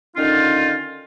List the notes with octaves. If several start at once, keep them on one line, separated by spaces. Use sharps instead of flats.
D3 D#3 C#4 D#4 F4